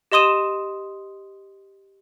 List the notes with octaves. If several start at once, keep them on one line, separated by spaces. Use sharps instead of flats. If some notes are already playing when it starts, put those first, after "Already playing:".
G4 D#5 C6 D#6 D#7 E7